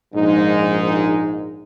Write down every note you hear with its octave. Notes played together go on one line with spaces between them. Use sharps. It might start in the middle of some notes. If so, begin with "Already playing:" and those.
A#1 G#2 G#3 D#4